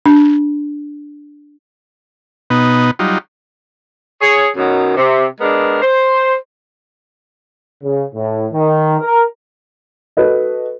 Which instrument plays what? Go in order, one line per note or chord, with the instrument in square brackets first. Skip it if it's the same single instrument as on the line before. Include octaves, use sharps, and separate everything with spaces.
[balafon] D4
[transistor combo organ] B2 B3 D#4
F#3 G3 D#4 F4
[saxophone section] G#4 C#5
F#2 B2 D#3 F#3
C3
G#3 B3 D4 A#4
C5
[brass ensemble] C#3
A2
D#3
A#4
[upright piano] F#4 A4 B4 D#5